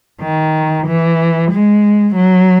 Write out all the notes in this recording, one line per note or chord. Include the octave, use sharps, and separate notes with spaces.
D#3
E3
G#3
F#3